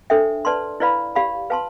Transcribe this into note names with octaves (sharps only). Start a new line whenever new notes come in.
D4 A4 C5 E5 G5
B4 D5 A5 C6
E4 B4 D5 F5 B5
G4 D5 F5 B5
B4 F5 A5 C6